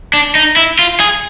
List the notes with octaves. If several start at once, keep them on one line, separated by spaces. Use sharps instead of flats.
D4
D#4
E4
F4
G#4